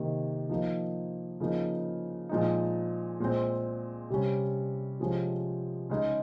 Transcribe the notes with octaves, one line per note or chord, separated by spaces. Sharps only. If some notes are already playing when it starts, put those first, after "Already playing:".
Already playing: C3 D#3 A#3
F3 A#3 D#4
C#3 F3 A#3 D#4
A#2 F3 G#3 D#4
A#2 G#3 C4
C3 G3 C#4
C3 F3 G#3 C#4
C#3 G#3 D#4